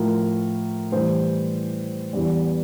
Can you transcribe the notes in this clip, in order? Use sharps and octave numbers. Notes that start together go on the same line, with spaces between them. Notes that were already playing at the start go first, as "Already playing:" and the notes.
Already playing: A2 F3 A#4
A2 E3 G3 C5
E2 E3 G3